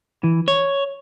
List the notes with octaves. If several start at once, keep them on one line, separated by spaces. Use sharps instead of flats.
E3
C#5